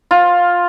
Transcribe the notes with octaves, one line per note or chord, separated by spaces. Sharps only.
F4